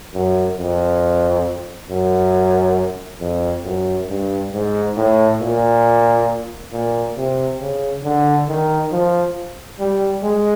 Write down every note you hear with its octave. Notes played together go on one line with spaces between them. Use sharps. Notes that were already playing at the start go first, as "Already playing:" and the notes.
F#2
F2
F#2
F2
F#2
G2
G#2
A2
A#2
A#2
C3
C#3
D3
D#3
F3
G3
G#3